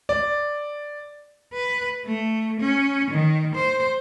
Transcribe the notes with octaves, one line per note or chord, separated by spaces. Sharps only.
D5
B4
A3
C#4
D#3
C5